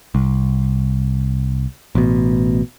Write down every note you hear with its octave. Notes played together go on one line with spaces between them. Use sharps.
C2
A1 B2